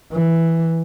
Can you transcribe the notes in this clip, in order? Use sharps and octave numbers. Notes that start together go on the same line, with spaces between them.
E3